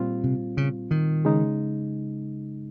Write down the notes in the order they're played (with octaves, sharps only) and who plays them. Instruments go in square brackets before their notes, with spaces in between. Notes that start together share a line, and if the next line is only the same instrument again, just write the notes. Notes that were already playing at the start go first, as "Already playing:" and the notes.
Already playing: [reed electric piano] A#2 G3 C4 F4
[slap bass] C3
C#3
D#3
[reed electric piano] C#3 G#3 D#4